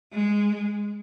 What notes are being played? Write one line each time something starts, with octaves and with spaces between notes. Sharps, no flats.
G#3